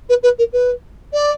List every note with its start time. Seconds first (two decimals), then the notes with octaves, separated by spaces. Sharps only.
0.09 B4
0.22 B4
0.38 A#4
0.52 B4
1.13 D5